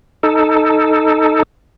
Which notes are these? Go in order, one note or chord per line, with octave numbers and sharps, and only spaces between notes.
D#4 A4